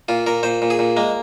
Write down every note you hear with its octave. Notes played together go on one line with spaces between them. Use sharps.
A#2 F4
A#2 A#4
A#2 C5
A#2
G#4
A#2
G#3 A#3